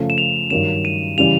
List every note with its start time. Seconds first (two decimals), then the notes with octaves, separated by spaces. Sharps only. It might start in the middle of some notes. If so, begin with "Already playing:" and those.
Already playing: C#3 F3 A3
0.10 E7
0.18 F7
0.50 G2 D#3 F#3 E7
0.85 D#7
1.18 C#3 E3 G3 F7